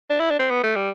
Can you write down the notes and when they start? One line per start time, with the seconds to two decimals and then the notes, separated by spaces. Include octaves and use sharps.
0.10 D4
0.20 E4
0.31 D4
0.39 C4
0.50 B3
0.64 A3
0.76 G3